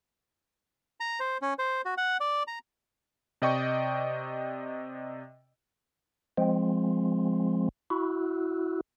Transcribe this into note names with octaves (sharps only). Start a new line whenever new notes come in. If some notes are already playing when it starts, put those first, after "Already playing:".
A#5
C5
C#4
C5
F#4
F#5
D5
A#5
C3 D5 D#5 G5 C#6
F3 G#3 C4
E4 F#4